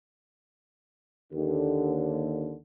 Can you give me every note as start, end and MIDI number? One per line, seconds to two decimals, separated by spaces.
1.33 2.54 39
1.33 2.54 50